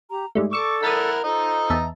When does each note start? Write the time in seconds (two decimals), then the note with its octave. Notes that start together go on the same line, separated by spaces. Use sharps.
0.09 G4 A#5
0.35 G#2 G3 A3 G#4
0.53 A4 D5 C#6 D6 E6 C#7
0.83 E4 A#4 F#5 D#6 A6 B6
1.24 F4 A4 C5 D#5 A#5
1.70 E2 E5 A5